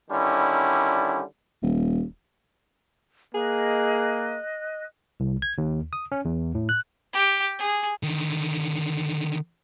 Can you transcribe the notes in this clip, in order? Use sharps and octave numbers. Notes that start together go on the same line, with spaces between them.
D3 D#3 G3 C#4 D4 E4
D#1
A#3 G#4 D#5 F#6
C2
G#6
D#2
D#6
C#4
E2
A2
F#6
G4
G#4
D3 D#3